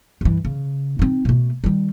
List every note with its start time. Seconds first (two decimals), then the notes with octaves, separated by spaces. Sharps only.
0.21 G2 E3
0.45 C#3
0.99 C4 D#4
1.25 B2 A3
1.64 D#3 G3